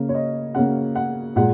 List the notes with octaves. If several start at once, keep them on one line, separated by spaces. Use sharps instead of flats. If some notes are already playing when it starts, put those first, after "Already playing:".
Already playing: C#3 A#3
C#5
D#5
C#3 A#3 F#5
F#5
A#2 G#3 F#5